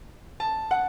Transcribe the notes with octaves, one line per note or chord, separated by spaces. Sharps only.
A5
F#5